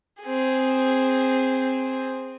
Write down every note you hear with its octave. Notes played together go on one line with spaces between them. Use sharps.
C4 G#4